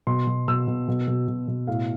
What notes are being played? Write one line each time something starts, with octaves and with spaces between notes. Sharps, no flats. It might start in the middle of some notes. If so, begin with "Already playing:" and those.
B2 C6
B2
B2 E6
B2
B2
B2
B2
B2
A2 F5